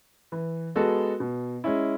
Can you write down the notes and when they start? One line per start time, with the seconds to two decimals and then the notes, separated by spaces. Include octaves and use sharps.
0.32 E3
0.75 G#3 B3 F#4 A4
1.20 B2
1.64 G#3 C#4 E4